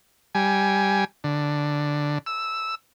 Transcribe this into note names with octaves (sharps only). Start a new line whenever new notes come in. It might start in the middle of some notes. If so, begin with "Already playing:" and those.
G3 G#5
D3
E6